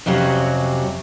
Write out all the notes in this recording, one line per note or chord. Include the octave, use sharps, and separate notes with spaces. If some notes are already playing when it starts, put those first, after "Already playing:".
F2 C3 F#3 C#4